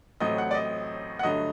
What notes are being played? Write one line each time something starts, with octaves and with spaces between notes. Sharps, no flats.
A1 A2 F#3 A3 C4 D#5
F#5
D5
D#5
F#5
G2 D3 F#3 A3 D#5